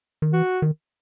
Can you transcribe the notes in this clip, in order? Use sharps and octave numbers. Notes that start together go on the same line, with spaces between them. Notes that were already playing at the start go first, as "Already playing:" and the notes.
D#3
E3 F#4
D#3